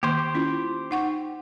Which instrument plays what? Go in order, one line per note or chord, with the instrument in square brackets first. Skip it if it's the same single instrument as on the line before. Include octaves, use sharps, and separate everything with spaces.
[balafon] D#3 A#3 [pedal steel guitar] G4 C5
[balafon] C#4 E4 F4
D#4 F#5 C#6